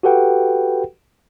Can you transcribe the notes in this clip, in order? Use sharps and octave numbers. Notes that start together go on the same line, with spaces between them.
F#4 G4 A4 B4 F#5 G5